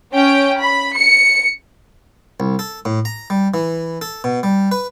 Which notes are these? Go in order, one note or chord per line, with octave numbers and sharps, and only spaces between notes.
C#4 G5
B5
C#7
C2
A4
A2
A#5
G3
E3
A4
B2
G3
B4